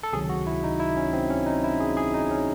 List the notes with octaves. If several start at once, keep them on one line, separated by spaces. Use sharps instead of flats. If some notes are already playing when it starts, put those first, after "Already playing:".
A4
C#2 C3 D#3 F#3 G#4
F#4
E4
D#4
E4
C#4
C4
C#4
D#4
E4
G#4
G#4
D#4
C#4